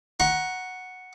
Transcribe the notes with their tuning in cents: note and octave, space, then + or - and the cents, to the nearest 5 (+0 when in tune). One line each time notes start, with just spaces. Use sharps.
F#5 +0 A#5 +25 C#6 -30